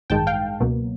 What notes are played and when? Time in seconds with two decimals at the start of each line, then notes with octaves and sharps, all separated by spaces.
0.10 A1 G2 D#3 G#3 G5 A5
0.27 F5 G5
0.60 C#2 B2 F#3 A#3